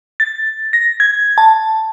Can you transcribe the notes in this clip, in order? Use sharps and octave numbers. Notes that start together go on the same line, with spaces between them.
A6
A#6
G#6
A5